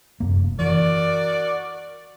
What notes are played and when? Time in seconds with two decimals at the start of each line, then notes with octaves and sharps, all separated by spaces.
0.20 F1 F#2 A#3
0.59 E3 F#4 A#4 D5